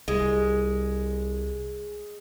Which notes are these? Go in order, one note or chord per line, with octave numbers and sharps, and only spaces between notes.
C2 G#3